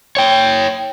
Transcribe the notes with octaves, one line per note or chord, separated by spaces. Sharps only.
C#5 G5